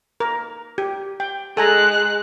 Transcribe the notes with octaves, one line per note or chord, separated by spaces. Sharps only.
A#4
G4
G5
G#3 A4 G#5 A#5 F#6